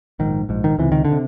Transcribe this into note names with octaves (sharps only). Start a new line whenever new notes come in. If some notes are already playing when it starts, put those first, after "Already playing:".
A#1 G#2 D#3
A#1 G#2
D#3
C#2 C3 E3
D#3
D3
C3